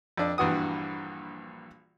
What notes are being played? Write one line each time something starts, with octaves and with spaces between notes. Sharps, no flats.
F2 D4
A#1 G2 E3 F#4 D#6